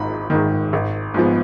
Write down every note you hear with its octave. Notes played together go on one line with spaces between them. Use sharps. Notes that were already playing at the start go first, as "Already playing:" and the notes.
Already playing: G#1 G#2 D#3 A#5 B5
G#2 D#3
G#1
G#2 F3 B3